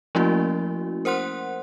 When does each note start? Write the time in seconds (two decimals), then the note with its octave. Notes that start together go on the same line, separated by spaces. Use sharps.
0.15 F3 A3 A#3 C#4 E4 F#4
1.05 A#4 C5 F#5 C6 F#6